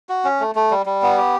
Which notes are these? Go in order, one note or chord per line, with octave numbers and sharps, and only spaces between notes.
F#4
C#4
A3
A3
G3
G3
B3
G4